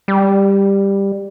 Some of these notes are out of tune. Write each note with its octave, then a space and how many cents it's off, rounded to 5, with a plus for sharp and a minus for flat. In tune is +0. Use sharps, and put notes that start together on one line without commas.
G3 +10